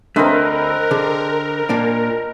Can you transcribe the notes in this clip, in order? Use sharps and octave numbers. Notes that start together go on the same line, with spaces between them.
D2 A3 C4 D4 A#4 B4 D#5
D3 G#4
A#2 A#3 D4